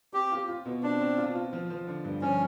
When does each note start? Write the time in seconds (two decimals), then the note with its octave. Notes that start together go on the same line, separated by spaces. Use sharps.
0.14 C4 G4
0.31 F4
0.48 F4
0.65 B2
0.83 C4 D4
1.01 C4
1.17 F4
1.35 F4
1.53 F3
1.70 F3
1.87 D3
2.05 G2
2.22 F3 C#4